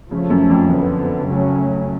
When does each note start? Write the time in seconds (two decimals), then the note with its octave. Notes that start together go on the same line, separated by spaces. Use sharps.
0.10 C#3 F3 A3 C#4
0.30 F#2
0.50 F2
0.69 F#2 D3 F3 B3
1.28 C#3 F#3 A3 C#4